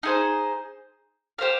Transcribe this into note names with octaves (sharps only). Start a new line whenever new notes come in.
D#4 G#4 C5
G4 C5 F5